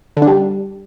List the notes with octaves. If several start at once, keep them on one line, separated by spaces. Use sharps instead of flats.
D3
D4
G3